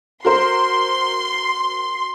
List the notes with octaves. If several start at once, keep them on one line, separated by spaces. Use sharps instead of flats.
F#4 A#4 C5 C6